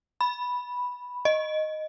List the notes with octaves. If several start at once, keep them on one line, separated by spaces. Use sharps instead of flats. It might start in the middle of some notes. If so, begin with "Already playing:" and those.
B5
D#5